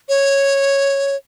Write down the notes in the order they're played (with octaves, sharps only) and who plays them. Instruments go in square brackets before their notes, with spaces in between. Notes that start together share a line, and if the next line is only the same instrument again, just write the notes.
[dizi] C#5